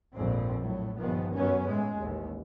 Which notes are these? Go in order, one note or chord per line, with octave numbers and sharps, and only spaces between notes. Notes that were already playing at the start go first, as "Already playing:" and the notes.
A#1 F2 G#2 C4
A2 F#3
G1 A#2 D#3 F3 B3
F#2 F#3 B3 C#4
A2 G#3
A1 D#2